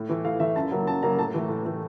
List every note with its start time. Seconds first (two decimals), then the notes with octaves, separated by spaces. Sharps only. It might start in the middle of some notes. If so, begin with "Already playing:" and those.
Already playing: A2
0.09 E3 A3
0.24 A2 F5
0.40 E3 A3 E5
0.56 F#2 A5
0.71 C#3 F#3 A#3
0.87 F#2 A5
1.03 C#3 F#3 A#3 A#5
1.18 A2 A5
1.34 E3 A3
1.49 A2
1.65 E3 A3